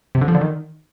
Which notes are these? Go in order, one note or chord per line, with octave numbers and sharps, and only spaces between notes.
C3
D3
F3
D3
D#3